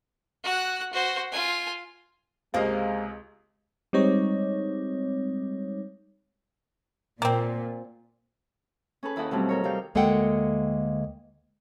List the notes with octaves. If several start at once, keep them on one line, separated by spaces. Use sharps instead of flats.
F#4 F#6
F#4 C5
F4 G#5
C#2 C3 G#3 A#3 A#4 C5 D#5 F5
G3 G#3 C4 D#4 C#5
A#2 A#3 C4
C#4 G#4 A4 B4
D#2 E4 A4 D#5 F#5
B2 F#3 G3 A3 B3 C4
A4 A#4 C#5
C3 G3 F5 G5
D2 G#3 A#3 A4 F#5 G5